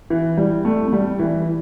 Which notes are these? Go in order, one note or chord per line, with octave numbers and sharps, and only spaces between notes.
E3
G3
A3
A3
G3
E3